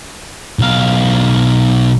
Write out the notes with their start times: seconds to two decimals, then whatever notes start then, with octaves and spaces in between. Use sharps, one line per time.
0.59 B1 F5